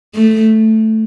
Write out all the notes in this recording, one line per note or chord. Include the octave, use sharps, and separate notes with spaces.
A3